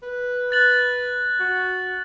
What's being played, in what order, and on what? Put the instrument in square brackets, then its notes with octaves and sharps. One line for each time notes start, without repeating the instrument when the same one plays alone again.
[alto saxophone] B4
[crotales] F#6 A6 F#7
[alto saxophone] F#4